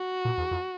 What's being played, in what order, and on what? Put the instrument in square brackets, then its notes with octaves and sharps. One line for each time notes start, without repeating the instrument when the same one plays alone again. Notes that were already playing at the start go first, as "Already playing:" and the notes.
Already playing: [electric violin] F#4
[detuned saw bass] A#2
E2
F2